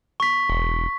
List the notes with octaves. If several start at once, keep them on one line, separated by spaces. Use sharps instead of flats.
C#6 B6
E1